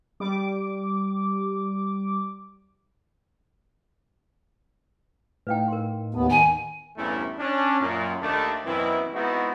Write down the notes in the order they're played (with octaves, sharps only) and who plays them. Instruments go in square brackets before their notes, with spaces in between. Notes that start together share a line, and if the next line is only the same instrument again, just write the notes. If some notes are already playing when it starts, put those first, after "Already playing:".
[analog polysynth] G3 D6
[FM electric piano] A2 D#4 [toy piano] B4 F5 G5
[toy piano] A#4 C6
[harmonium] D#2 B3 [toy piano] A5
[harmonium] D#3 [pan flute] G#5 [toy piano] A#5
[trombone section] E2 G2 C3 A3 C#4 E4
C#4 D4
F#2 A#2
D#2 A3 D4
F#2 B2 D#3 E3 C4 E4
G#3 B3 C4 D#4 E4 F#4